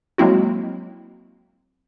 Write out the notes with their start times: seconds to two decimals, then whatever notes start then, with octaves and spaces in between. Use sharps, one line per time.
0.18 F#3 G#3 A#3 C4 E4 F#4